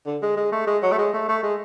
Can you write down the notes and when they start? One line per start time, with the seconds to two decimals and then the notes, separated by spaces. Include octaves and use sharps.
0.07 D3
0.22 G#3
0.37 G#3
0.52 A3
0.67 G#3
0.83 F#3
0.92 A3
0.98 G#3
1.14 A3
1.29 A3
1.43 G#3